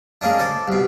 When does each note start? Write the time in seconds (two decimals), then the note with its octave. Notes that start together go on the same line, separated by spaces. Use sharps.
0.21 G#3 A#3 C#4 D4
0.39 A4 C5 D5
0.68 C2 B2